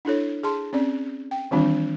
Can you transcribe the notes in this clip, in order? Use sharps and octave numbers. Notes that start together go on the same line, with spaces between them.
D4 E4 A4 C#5
G#4 A5 C6
C4 C#4 D5
G5
D#3 E3 G3 C4 D4 F4